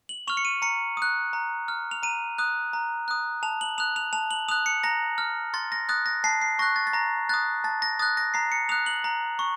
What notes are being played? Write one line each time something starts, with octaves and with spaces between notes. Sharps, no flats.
F#7
C#6 F6 F7
C#7
D#7
A#5 C#7
D#6 F#6
A#5
F6
F7
A#5 D#7
D#6 F#6
A#5
D#6 F#6
A5 F7
F#7
D#6 F#6 F7
F7
A5 F7
F#7
D#6 F#6 F7
C#7
A#5 A#6
F6
C6 A6
A#6
D#6 F#6 A6
A#6
A5 C7
C7
C#6 F#6 A#6
A6
A6
A#5 A#6
D#6 F#6 A6
A5 A6
A#6
D#6 F#6 A6
A#6
A#5 C7
C#7
D#6 F#6 F7
F#7
A#5
C#6